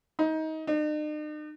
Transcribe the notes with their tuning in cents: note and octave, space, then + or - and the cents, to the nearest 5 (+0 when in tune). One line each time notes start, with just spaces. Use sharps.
D#4 +25
D#4 -45